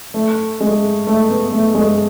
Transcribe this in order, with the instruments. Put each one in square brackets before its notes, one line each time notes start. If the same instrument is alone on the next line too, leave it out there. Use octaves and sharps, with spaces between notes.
[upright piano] A3
G#3
A3
B3
A3
G#3